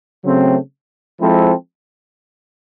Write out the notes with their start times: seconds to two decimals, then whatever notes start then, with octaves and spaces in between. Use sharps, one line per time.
0.23 C#3 F#3 A3 C4
1.18 F3 G#3 C4 E4 A4